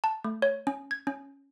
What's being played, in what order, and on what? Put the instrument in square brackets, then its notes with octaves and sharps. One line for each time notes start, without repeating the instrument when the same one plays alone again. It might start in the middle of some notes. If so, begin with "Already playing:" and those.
[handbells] A5
A3
C#5
C#4
G#6
C#4